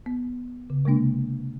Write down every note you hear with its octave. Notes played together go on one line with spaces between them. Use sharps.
B3
C#3
C3 G#3 A#3 D4